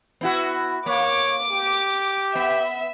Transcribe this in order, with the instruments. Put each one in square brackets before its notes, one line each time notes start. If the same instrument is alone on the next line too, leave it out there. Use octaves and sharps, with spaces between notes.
[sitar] B3 E4 F#4
[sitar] A#3 [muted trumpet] C#5 [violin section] D6
[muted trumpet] G4
[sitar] B3 [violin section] E5